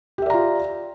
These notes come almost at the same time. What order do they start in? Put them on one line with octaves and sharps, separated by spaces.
G4 E5 D5 A#5 F4